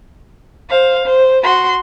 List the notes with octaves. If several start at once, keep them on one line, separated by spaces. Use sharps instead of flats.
C5 F5
C5
F#4 C6